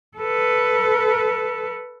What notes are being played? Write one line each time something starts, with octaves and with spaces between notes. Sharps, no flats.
A4 B4